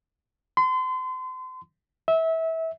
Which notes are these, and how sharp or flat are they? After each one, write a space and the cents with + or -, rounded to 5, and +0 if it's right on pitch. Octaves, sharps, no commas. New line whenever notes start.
C6 -35
E5 -25